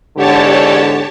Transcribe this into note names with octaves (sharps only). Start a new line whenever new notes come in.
E2 G#2 D3 G4 C#5 A5